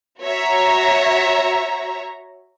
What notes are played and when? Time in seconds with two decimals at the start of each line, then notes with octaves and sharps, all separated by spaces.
0.20 F#4 C#5 E5 A#5